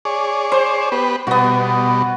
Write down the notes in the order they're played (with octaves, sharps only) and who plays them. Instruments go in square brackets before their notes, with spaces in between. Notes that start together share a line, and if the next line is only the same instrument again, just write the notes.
[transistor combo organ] G#4 C#5 D5
[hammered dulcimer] C5
[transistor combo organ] B3 G4 B4
[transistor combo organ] B2 G3 [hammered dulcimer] B3 F#4